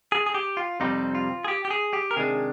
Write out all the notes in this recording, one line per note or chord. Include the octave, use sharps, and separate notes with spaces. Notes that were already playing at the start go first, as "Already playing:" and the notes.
G#4
G#4
G4
F4
F2 C3 G3 C4 D#4
F4
G#4
G4
G4
G#4
G4
A#4
C3 D#3 G#3 D4 G#4